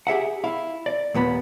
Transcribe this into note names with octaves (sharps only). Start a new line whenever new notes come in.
G4 G#4 E5 F#5
E4 F5
D5
D#2 A#2 B3 B5